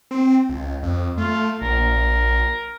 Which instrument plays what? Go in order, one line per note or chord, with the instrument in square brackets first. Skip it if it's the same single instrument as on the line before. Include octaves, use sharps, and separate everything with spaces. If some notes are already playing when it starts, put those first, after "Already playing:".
[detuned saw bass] C4
C#2
F2
[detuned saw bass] A3 [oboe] F4
[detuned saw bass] A#1 [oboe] A#4